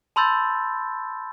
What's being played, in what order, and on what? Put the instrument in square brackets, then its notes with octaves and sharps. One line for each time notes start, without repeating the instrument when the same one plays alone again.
[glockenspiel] A5 B5 C6 E6 G6 A6